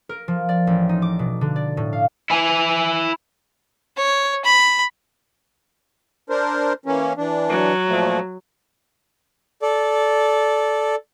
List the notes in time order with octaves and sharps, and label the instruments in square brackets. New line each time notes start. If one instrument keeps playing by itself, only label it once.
[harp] A#4
F3
D5
A1
D#4
D6
B2
D3
D5
A2
F5
[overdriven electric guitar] E4 G#5
[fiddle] C#5
B5
[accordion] D4 A#4 C5
E3 A#3 C#4
E3 D4
[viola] F#3
[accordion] A#2 F3 A3
[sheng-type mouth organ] A4 D5